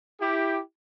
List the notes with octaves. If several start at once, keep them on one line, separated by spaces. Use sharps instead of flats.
E4 G4